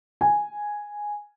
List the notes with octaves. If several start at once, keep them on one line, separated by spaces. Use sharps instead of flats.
G#5